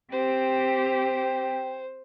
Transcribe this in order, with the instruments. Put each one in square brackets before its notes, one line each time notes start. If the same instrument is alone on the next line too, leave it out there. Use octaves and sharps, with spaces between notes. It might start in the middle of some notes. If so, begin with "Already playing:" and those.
[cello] C4 G4 [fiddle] C5 [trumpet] G5